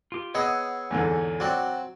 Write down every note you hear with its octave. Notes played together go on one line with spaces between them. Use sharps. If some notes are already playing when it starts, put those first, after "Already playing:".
F4 G4
B3 G#4 C#5 D#5 F#5 E6
E2 G#2 D3
F#3 C4 F#4 D5